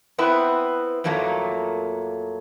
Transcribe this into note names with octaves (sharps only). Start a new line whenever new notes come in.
B3 C4 E4 B4
F2 A#2 F#3 A3 A#3